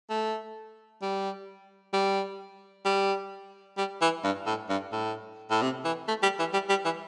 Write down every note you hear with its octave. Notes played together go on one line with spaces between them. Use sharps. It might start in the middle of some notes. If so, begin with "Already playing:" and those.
A3
G3
G3
G3
G3
E3
G2
A2
G2
A2
A2
C3
E3
A3
G3
E3
G3
G3
E3